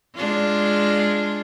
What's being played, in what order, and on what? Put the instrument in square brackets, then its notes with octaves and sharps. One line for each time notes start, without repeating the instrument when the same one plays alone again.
[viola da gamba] G#3 D4 F4